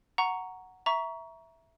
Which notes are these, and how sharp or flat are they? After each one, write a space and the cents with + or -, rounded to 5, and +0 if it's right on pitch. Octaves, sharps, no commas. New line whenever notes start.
F#5 +0 A#5 +0 C#6 +10
E5 +0 A#5 +15 C#6 +20